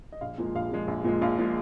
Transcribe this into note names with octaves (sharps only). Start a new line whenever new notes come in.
D#5
A#1 F5
A#2 F3 G#3
A#1 F5
A#2 F3 G#3
A#1
A#2 F3 G#3
A#1 F5
A#2 F3 G#3